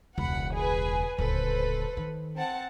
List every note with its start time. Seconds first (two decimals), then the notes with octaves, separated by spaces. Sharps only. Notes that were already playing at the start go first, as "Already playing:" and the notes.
0.18 E1 C#2 F#5 B5
0.54 G#4 B4 G#5
1.19 D1 C#2 A4 B4 C5
1.97 D#3
2.36 C4 F#5 A5